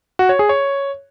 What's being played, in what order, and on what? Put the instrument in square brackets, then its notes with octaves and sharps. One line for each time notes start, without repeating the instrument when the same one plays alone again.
[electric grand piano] F#4
C#5
G#4
C#5